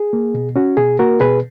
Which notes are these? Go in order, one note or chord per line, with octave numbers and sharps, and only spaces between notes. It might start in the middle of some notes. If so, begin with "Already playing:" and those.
Already playing: G#4
A#3
B2
C#4 F#4
B2 G#4
A#3 F#4 A#4
B2 G#4 B4